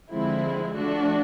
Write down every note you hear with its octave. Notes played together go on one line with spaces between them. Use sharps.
D3 F3 G#3 C4 E4
F3 A3 D4 F#4